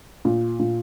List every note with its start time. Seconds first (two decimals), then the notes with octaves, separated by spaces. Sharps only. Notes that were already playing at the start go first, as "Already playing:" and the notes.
0.25 A#2
0.59 A#2